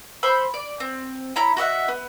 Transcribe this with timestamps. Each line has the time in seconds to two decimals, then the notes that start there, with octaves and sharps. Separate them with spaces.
0.23 C5 B5 C#6 E6
0.54 D5
0.80 C4
1.36 E4 C#5 A#5 B5
1.57 F#4 D#5 E5 F#5
1.88 B3